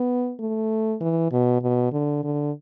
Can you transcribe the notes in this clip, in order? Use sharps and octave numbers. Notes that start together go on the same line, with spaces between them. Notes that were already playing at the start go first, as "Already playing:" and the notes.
Already playing: B3
A3
E3
B2
B2
D3
D3